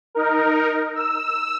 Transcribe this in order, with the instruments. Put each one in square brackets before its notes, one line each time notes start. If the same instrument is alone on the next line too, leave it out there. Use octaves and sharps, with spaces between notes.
[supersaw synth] D#4 A#4
E6